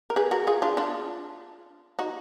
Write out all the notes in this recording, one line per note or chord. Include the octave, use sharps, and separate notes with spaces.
A#4
G#4 B4
F#4 A#4
F4 G#4
D4 F4
D4 F4
D#4 F#4